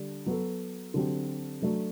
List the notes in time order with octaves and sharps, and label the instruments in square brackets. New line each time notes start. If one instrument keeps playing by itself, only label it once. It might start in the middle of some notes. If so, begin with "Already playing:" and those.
Already playing: [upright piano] D3 G3 D4
F#3 B3 F#4 A4
D3 F#3 C4 G4
F#3 A3 D4